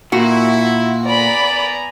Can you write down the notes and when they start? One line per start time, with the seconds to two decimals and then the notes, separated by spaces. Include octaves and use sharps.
0.12 A#2 E4 F#4
1.05 B3 D5 G#5 A#5 B5